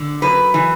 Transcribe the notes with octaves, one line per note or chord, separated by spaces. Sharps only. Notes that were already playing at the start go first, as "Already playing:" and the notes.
Already playing: D3
F#2 B4
E3